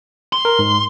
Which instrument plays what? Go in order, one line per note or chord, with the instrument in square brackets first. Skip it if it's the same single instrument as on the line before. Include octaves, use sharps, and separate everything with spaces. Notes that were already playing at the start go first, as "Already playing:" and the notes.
[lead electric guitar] C6
[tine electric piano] A#4
G#2